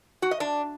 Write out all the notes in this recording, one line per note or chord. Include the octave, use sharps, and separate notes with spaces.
F#4
D#5
D4